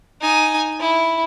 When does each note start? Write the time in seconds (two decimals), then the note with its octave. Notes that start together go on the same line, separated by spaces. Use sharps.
0.21 D#4 G#5
0.80 E4